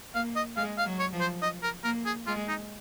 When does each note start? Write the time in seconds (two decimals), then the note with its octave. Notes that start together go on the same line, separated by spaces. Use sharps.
0.14 A#3 F5
0.36 D#5
0.56 G#3 F5
0.78 F5
0.86 F#3
0.99 C#5
1.13 F3
1.20 C5
1.42 D#5
1.63 A#4
1.83 A#3 A#4
2.05 G#4
2.27 G#3 F4
2.48 D#4